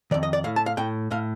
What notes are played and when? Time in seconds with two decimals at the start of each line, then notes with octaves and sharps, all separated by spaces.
0.11 F2 D#3 D5
0.23 D#5
0.33 D5
0.44 A2 F5
0.56 A5
0.66 F5
0.77 A2 G5
1.11 A2 F5